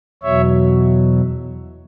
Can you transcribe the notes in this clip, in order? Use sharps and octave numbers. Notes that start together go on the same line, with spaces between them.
E2 B2 F#3 C#5 E5